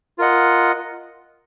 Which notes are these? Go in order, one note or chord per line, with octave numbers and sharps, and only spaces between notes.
F4 A#4 D#5 F#5